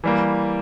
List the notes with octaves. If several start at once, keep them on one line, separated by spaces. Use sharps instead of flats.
E3 G3 A#3